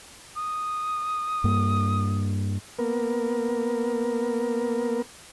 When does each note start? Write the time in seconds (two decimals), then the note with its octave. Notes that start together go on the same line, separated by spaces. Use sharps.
0.37 D#6
1.44 G2 A#3
2.79 A#3 B3 A#4